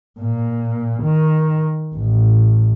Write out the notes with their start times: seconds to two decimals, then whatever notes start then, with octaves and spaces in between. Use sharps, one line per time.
0.20 A#2
1.02 D#3
1.95 A1